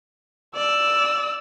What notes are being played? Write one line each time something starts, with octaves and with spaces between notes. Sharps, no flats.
D5 E6